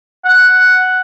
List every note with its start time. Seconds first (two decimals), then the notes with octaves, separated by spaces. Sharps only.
0.25 F#5